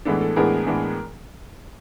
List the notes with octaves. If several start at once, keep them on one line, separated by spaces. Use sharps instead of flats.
A2 E3 G#3 B3 D4 A4
A4
A2 E3 G#3 B3 D4 G#4 A#4
A2 E3 G#3 B3 D4